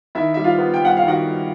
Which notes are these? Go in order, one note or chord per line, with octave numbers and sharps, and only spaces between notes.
D#3 E4 E5
G3 E5
F4 F5
B3
G5
G2 F#5
F5
D#3
F#4 F#5
G3